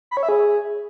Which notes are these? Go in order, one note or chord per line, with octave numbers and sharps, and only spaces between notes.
B5
C#5
E5
G#4